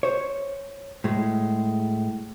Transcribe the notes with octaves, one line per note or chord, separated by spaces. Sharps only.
C5 C#5
A2 G#3